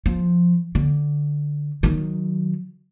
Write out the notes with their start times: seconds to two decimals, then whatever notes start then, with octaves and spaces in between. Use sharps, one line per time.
0.06 F3
0.75 D3
1.83 D#3 F#3